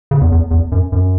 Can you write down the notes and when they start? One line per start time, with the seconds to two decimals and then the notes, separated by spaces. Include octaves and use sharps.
0.11 C#3
0.21 E2
0.32 E2
0.51 E2
0.72 F#2
0.92 F#2